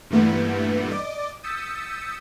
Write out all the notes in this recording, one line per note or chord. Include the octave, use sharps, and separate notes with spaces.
G2 A#2 E3 G3 A3 B3
D5 D#5 D6
D#6 E6 G6 A6 B6 C#7